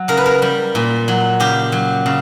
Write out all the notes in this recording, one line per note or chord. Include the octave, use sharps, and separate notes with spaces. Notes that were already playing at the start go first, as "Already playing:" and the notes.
Already playing: F#3
C#3 A#4
B4
A#4
G3
A#2
F#3
C#3 G4
F#3
C#3